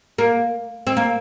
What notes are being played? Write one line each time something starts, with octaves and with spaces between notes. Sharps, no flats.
A#3
C4
A#3